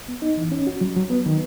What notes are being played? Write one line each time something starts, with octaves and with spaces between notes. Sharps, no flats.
B3
D#4
E3
C#4
F#4
F#3
F#3
B3
D#3